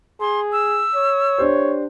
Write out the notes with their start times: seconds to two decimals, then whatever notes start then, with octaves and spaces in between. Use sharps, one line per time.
0.20 G#4 C6
0.52 E6
0.95 C#5
1.38 D4 G4 C5